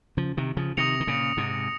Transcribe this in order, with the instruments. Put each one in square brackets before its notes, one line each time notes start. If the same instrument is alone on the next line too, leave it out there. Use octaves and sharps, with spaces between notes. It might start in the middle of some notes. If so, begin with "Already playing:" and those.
[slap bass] C#3 F3
C3 D#3
C#3 F3
[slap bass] C3 D#3 [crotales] D#6 A#6 C#7 F7
[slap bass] D#3
A#2 C#3
G#2 C3